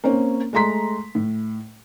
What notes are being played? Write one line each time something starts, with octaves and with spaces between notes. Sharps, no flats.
A#3 C4 C#4
G#3 A3 A#5 C6 B6
A2